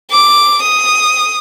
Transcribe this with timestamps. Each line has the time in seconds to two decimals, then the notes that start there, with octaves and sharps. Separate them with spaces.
0.11 D6
0.62 D#6